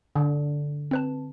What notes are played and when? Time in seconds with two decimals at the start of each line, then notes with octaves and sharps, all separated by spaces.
0.16 D3
0.91 C4 B4 A5